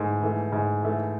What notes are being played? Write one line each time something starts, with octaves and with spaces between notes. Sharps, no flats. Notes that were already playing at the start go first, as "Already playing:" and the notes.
Already playing: G#2 E3 A3
E3 A3
G#2
E3 A3